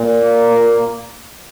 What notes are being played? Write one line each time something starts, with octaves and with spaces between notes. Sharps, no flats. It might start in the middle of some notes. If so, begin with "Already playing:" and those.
Already playing: A#2
A#3
A#2